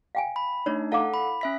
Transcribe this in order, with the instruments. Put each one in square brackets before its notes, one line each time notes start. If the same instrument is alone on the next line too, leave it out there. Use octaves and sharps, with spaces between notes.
[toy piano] F5 G5 G#5
[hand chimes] B5
[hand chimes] A3 D4 D#4 [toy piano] C#5
[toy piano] E4 F5 D6 [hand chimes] A4 F#5
[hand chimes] B5
C#4 E5 B6